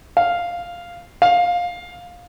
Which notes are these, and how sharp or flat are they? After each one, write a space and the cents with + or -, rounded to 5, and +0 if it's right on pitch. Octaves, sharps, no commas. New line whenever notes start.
F5 +0
F5 +15